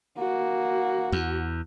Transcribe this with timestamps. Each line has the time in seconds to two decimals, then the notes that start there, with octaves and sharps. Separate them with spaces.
0.18 A#3 F#4
1.12 E2